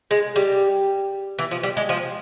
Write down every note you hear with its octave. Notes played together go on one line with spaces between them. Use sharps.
G#3
G3
E3
F3
G3
G#3
F3